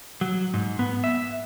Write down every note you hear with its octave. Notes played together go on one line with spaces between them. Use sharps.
F#3
G#2
B3
E5